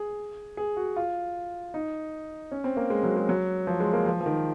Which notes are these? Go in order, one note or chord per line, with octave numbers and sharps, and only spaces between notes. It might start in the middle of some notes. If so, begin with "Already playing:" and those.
Already playing: G#4
G#4
F#4
F4
D#4
C#4
C4
A#3
G#3
F#3
G#3
F#3
F3
G#3
A#3
F3
F3
D#3